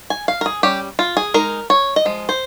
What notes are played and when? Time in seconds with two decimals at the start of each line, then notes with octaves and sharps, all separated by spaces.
0.10 G#5
0.28 F5
0.41 A#4
0.46 G#4
0.63 G3 C#4 G4
0.99 F4
1.17 G#4
1.34 G#3 D#4 A#4
1.70 C#5
1.96 D#5
2.05 F3 G#3
2.29 C5